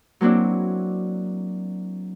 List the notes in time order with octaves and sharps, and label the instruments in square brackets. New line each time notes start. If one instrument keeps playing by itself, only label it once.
[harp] F#3 A#3 C4 D4 E4